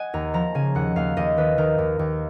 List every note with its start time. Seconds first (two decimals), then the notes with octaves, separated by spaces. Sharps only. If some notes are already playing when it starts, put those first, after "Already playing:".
Already playing: D#5 F#5 G#5
0.14 D#2 A#5
0.34 F3 A#5
0.55 C#3 G#5
0.75 D#2 F#5
0.96 D#2 F5
1.17 D#2 D#5
1.37 D#3 B4
1.57 D#3 A#4
1.78 D#2
1.99 D#2